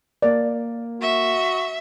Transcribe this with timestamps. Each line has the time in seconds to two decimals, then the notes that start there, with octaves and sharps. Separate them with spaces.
0.22 A#3 A#4 D5
1.01 F#4 E5